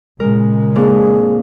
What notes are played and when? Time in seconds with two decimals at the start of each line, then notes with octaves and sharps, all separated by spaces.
0.20 A#2 C#3 G#3 A#4
0.75 F2 A#3 D4 G#4